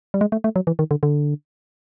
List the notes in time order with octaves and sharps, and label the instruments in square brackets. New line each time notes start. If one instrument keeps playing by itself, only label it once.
[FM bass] G3
G#3
A3
A3
F#3
E3
D#3
D3
D3